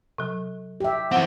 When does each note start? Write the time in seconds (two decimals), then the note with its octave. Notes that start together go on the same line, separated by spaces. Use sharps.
0.18 C3 F#3
0.80 G4 E5
1.11 E3 C4 F#5